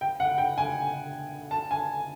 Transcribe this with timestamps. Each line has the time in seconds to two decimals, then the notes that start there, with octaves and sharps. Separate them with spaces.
0.01 G5
0.20 F#5
0.38 G5
0.58 G#5
1.51 A5
1.71 G#5